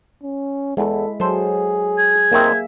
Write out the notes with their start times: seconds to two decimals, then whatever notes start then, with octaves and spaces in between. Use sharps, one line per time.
0.23 C#4
0.77 E2 G#3 E4 A4
1.20 F#3 G#4 A4 C5
1.98 G#6
2.32 D#2 D#3 A#3 C4 E5